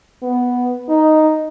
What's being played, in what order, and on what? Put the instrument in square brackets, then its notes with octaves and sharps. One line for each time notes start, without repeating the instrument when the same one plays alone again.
[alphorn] B3
D#4